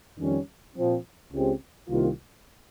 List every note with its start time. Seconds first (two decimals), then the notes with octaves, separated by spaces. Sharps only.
0.19 F2 D#3 G3 C#4
0.76 A#2 F3 C4
1.32 C#2 C#3 G#3 C4 G4
1.89 C2 C3 D#3 A#3 F4